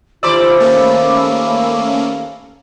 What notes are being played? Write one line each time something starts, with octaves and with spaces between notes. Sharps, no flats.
D#2 F4 C5 D5 B5 D6 E6
A3 A#3 C#4 F5